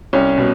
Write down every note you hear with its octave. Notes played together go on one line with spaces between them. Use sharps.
C2 C#4
B2